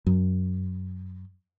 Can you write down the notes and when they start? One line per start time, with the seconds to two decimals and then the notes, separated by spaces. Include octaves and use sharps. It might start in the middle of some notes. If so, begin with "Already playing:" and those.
0.06 F#2